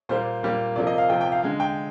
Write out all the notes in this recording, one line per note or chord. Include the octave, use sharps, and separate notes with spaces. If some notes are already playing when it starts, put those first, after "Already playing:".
A#2 G3 A#3 C5
A#2 G3 A#3
C3 F3 A#3 D5
D#5
F5
C3 F3 A#3 G5
G5
F5
D3 G#3 F5
G5